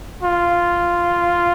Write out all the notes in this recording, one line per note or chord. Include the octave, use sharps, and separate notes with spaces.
F4